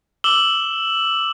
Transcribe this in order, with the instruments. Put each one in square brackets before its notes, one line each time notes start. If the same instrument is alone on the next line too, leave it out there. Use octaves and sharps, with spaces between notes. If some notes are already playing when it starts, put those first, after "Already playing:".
[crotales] D6 E6 E7 F#7 G7